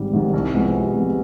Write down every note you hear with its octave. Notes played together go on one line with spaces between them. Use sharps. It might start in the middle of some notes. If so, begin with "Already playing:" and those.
Already playing: G#1 G#2 D#3 G3
G#2 D#3 G3
C2
C3 F3 G#3 B3
C2
C3 F3 G#3 B3